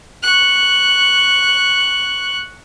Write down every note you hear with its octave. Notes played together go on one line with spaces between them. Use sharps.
C#6 F#6